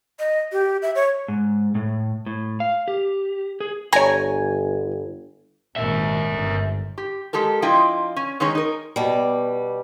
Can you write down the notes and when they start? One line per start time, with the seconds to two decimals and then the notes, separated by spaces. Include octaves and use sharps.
0.20 D#5
0.52 G4
0.82 E5
0.95 C#5
1.28 G#2
1.75 A2
2.26 A2
2.60 F5
2.88 G4
3.60 G#4
3.93 G1 C#5 G#5 A#5
5.76 G#1 A#2 D#3 A#4 E5
6.28 G1
6.98 G4
7.33 G#3 G4 A4 A#4
7.62 F3 D4 E4 F4 D#5 G5
8.16 C#4
8.40 D#3 G#3 C#4 D#4 G#4 C#5
8.55 D#4 A#4
8.96 B2 G3